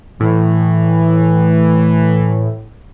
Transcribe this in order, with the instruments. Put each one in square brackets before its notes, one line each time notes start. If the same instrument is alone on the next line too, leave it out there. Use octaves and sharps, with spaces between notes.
[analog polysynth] A2 [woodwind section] E3